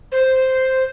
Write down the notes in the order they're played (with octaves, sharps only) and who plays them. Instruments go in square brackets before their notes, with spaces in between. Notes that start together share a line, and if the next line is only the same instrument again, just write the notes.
[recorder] C5